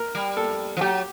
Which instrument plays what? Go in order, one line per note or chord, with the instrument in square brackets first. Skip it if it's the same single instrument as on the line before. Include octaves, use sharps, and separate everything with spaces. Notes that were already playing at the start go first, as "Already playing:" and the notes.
Already playing: [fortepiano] A#4
[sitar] G3
[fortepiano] A4
[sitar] F3
[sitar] F#3 [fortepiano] G4